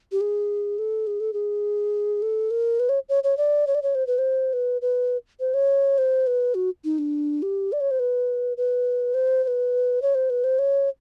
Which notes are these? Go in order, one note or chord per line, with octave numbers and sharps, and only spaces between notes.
G4
G#4
A4
G#4
A4
G#4
A4
A#4
B4
C#5
C#5
C#5
D5
C#5
D5
C#5
C5
B4
C5
B4
B4
C5
C#5
C5
B4
F#4
D#4
D4
G4
D5
C#5
C5
B4
B4
C5
C5
B4
C#5
C5
B4
C5
C#5